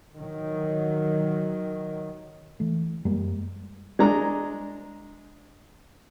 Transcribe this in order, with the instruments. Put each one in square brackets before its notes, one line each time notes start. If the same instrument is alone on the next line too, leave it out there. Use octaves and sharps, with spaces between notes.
[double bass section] D#3 F#3
[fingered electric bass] E3 A3
F#2 G3 G#3 A#3
[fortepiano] G#3 D4 A#5